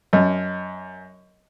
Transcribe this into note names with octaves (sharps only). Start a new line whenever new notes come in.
F#2 C#5 D#5 A5